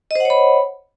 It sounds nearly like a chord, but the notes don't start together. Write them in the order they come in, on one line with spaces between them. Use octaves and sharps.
D#5 C5 F#5 C#5 B5